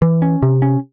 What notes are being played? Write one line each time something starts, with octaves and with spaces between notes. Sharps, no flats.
E3
C#4
C3
C#4